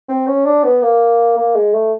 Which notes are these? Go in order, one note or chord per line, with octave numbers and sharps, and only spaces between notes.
C4
C#4
D4
B3
A#3
A#3
G#3
A3